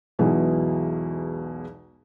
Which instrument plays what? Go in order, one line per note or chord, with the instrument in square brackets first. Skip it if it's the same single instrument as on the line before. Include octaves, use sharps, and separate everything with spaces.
[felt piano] B1 E2 B2 E3 F#3 G#3